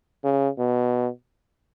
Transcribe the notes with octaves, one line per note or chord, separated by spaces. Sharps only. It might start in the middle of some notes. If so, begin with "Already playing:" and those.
C#3
B2